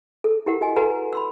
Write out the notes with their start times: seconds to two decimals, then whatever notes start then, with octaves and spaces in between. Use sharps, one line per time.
0.24 A4
0.46 E4 G4 A#4 F#5
0.61 F#4 D#5 G#5
0.76 F#4 A4 B4 F#5 G#5 A#5
1.13 B5 C6 E6